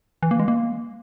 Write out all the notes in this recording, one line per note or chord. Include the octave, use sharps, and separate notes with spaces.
E3
A#3
G#3
A#3